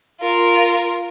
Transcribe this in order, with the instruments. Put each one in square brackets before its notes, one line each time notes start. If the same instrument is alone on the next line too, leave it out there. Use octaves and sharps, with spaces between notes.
[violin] F4 A#4